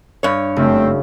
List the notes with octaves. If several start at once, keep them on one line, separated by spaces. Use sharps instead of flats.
G2 C#5
F#1 A3 C4